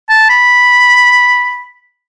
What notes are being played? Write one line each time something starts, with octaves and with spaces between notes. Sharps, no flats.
A5
B5